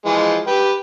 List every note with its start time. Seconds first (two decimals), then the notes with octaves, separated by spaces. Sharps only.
0.06 E3 F3 G#3
0.47 G4 B4 G5